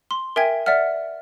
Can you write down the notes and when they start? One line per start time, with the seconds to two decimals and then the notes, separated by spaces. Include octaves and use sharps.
0.11 C6
0.36 A#4 E5 G5 G#5 G#6
0.66 D5 E5 F#5 F6